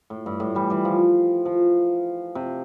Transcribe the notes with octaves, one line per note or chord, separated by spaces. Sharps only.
A2
G2
A2
E3 G3
E3 G3
F3
F3
C3